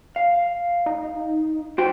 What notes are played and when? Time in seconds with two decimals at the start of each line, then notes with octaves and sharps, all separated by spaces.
0.16 F5
0.86 D#4
1.78 F#2 F#4 C5 G5